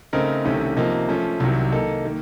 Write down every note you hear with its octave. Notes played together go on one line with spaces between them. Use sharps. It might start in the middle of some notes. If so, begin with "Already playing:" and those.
C#3 A3 C4 D#4 A#4
C2 C3 D#3 A3 C#4
C3 F3 A#3 D#4
F3 A3 C#4
C2 C3 D#3 F#3
D#3 A#3 D#4 A4
D#3 A#3